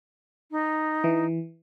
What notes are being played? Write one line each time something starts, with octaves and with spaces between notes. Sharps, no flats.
D#4
E3